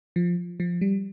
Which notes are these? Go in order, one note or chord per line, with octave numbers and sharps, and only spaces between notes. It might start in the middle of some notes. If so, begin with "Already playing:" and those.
F3
F3
G3